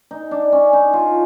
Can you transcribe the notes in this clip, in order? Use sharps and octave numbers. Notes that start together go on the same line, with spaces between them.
D#4
D4
C#4
D#4
F4